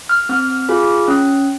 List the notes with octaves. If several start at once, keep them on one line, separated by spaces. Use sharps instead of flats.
F6
C4 F6
F4 G#4
C#4